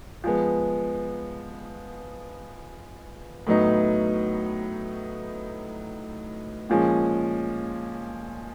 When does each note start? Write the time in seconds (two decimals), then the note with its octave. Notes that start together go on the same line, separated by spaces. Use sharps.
0.24 F3 G#3 B3
3.47 A2 F#3 B3 D#4
6.70 A#2 F3 G#3 C#4